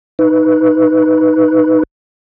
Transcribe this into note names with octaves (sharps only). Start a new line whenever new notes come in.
D#4 B4